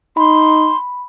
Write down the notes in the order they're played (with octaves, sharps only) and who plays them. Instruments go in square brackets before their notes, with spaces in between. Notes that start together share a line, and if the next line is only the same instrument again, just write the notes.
[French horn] D#4 [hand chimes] B5 [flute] C6